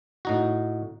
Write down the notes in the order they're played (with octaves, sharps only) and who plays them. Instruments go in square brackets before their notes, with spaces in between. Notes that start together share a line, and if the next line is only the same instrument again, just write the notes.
[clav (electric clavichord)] A2 D#4 F#4